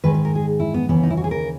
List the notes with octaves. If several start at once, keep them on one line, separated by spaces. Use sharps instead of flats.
G#2 D#3 G#3 B4
B4
A#4
G#4
E4
B3
D#2 C#3 E3 B3
D#4
E4
F#4
G#4
A#4